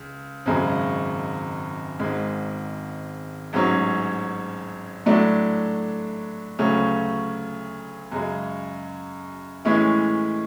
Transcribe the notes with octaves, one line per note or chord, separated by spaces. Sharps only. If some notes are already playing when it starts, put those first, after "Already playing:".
Already playing: C#2
G#1 F#2 C#3 G#3
G#1 G#2 G#3
A1 G#2 F#3 C#4
A2 F#3 A3 D4
D2 C#3 F#3 A3 C#4
F#2 C#3 G#3
A2 E3 G#3 C#4 E4